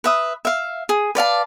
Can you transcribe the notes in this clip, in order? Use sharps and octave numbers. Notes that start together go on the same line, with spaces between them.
B4 E5 D#6
E5 F5
G#4
B4 D5 F5 A5